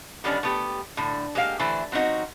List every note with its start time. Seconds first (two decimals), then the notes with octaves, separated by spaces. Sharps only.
0.24 D3 D#3 G3 B3 C#4 D4
0.43 A3 B3 G4
0.97 A2 D3
1.35 G#3 A#3 G4 D5 F5
1.59 D3 E3 A3 E4 C5
1.92 F#3 C4 C#4 D#4 F#4